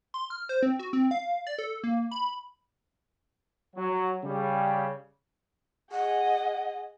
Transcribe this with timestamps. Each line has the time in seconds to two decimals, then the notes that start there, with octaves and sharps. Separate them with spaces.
0.14 C6
0.30 F6
0.49 C5
0.63 C4
0.79 F#4
0.93 C4
1.11 F5
1.47 D5
1.58 A4
1.84 A#3
2.11 B5
3.76 F#3
4.23 C#3 G3
5.92 G#4 D#5 F#5